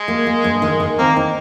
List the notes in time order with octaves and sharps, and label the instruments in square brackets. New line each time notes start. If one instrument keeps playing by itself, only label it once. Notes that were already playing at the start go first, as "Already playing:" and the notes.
Already playing: [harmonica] G#3
[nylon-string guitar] A#3
A#3
G2
D#3
D#3
[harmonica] A#3 [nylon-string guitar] C4
[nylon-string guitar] D#4